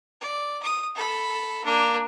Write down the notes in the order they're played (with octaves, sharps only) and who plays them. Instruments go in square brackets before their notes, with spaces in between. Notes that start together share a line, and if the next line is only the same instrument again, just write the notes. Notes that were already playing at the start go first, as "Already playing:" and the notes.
[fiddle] D5
D#6
A4 B5
A#3 D4